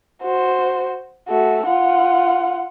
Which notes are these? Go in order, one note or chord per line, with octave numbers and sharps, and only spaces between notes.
F#4 C5
A3 F#4
F4 F#5